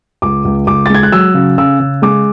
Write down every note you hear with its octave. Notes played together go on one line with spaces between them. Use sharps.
C#2 D6
C#2
C#2 D6
A6
G#3 G#6
F#6
F#3 E6
C#3
C#3 E6
C#3
G#3 D6